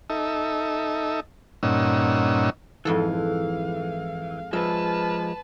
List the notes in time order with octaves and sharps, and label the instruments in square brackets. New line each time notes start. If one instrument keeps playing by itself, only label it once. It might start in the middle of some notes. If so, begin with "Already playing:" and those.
[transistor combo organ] D#4 A4 E5
G2 A#2 C#4 D#4 F#5 E6
[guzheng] F2 G#2 A4 [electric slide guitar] E3 [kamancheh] F5
[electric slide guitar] F3 G#3 [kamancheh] B4 A5 [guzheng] E5